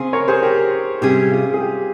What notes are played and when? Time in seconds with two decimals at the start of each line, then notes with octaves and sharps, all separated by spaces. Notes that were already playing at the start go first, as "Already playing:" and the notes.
Already playing: C#3 C4 G#4 G#5 C6
0.13 A#4 C#5
0.28 G#4 C5
0.42 G4 A#4
1.01 C3 G3 C#4 G4 G#4
1.31 F4
1.54 G#4
1.60 G4